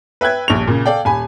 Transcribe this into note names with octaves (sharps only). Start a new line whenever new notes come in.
B4 E5 G5 F#6 G#6
D#1 A#1 C#6 F7
A#2 C#3
A4 D5 F5 G5
D#1 G#5 B5